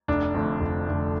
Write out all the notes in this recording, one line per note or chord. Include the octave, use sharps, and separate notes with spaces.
F1 D4
F2 D3 A3
F1
F2 D3 A3